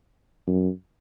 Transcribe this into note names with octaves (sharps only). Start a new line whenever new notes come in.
F#2